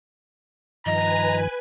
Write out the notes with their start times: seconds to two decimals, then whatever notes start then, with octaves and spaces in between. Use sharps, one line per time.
0.86 G2 D#3 F3 B4 D#5 G#5 A#5